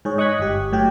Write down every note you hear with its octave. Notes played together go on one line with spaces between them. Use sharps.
G#2 G#4 C#5
D#5 C#6 D#6 F#6 G#6 B6
G1 G4
A2 F#3 G4 G5